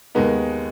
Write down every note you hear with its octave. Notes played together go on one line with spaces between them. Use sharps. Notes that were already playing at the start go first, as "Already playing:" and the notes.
D#2 D#3 G#3 B3 D#4